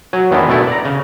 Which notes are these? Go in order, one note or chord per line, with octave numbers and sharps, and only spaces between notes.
F#3 G#5
E2 D#3 E3 G#3 B3 D4
B2 A3 D4 E4 A4
D5 A#5
C#3